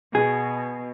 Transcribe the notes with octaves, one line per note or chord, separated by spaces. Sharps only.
B2 G#4